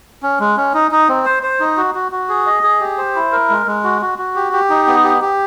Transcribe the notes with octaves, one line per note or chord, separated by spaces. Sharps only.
C#4
G#3
C#4
D#4
D#4
C4
C5
C5
D#4
F#4
F#4
F#4
G#4
D#5
G#4
G4
C5
E4
A#4
G#3
G#3
F#4
F#4
F#4
G4
G4
D#4
B3
G4
G4